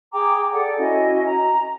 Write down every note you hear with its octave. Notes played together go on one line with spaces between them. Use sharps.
G#4 G5 A#5 D6
A4 D5 F#5 G5
C#4 E4 F#4 D#5
A#5